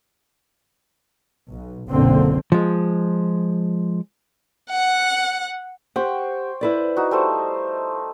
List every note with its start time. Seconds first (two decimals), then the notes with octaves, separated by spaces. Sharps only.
1.50 B1
1.89 F#1 B1 D3 A#3 C4
2.52 F3 G#3
4.73 F#5
5.96 G4 C5 F#5 G5 C#6
6.61 E4 B4 D5
6.97 D#4 F#4
7.11 G3 A3 C5